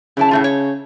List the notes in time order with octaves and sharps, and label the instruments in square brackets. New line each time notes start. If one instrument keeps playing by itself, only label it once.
[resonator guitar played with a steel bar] F#2 E4 A5 [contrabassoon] C#3
[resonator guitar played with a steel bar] A2 A3 F4
C#5